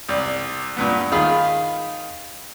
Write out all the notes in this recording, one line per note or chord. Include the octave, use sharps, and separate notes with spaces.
C2 D5
G2 A#2 B3
D#3 F4 G#4 B5